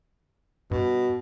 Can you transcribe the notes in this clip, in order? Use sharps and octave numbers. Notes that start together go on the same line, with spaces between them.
G2 B2